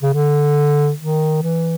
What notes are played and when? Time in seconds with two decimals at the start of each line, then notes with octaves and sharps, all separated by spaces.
0.03 C#3
0.14 D3
1.00 D#3
1.43 E3